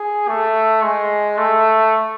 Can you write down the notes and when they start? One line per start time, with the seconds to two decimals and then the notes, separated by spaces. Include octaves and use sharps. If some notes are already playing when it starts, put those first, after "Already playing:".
Already playing: G#4
0.28 A3
0.83 G#3
1.38 A3